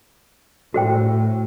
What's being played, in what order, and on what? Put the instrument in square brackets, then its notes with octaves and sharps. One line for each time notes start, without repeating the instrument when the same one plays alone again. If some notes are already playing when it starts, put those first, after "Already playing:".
[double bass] A2 [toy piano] F#4 C5 G5